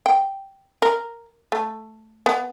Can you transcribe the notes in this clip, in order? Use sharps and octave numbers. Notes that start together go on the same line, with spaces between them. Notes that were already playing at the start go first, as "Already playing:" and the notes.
G5
A#4
A3
B3